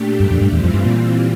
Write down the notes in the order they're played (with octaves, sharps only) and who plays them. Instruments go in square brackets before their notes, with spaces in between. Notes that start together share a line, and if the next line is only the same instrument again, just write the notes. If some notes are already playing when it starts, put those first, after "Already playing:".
Already playing: [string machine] A#2 A3 D4 G4
[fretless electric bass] G2
F2
G2
[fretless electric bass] E2 [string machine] E3 G3 C4 F4
[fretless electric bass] F2
G2
A#2